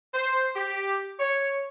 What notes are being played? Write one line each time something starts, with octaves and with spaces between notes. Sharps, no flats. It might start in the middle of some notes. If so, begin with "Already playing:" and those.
C5
G4
C#5